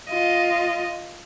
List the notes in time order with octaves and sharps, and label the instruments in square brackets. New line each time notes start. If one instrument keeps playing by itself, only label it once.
[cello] F4 D#5